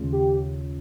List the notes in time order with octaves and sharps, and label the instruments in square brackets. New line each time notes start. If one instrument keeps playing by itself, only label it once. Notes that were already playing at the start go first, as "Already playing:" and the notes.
Already playing: [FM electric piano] D#2 C#3 G#3 C#4 F4
[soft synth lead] G4